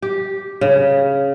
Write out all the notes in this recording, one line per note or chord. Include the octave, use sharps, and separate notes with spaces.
G4
C#3